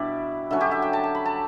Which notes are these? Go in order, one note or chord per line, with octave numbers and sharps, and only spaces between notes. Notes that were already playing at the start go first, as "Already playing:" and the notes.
Already playing: B2 G3 D4 E4 D5 E5
D3 F#3 C#4 E5
G4
E5
G5
A5
A5
B5
A5